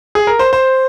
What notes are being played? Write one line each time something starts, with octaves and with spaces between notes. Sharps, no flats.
G#4
A#4
C5
C5